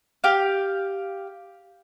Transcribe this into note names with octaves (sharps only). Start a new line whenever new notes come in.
G4 F5